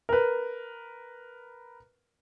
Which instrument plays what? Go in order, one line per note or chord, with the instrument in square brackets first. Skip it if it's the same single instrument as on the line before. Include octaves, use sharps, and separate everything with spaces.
[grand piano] A#4 B4